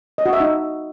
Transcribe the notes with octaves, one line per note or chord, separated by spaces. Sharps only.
D#5
F#4
E5
D#4